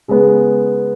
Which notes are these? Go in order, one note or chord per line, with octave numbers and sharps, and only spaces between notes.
C#3 G#3 B3